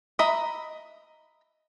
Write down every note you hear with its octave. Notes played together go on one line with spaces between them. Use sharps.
D#5 E5 A#5 B5